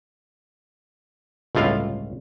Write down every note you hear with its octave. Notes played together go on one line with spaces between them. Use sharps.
G1 C#2 A2 F4 F5